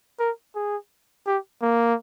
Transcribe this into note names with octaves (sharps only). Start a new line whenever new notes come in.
A#4
G#4
G4
A#3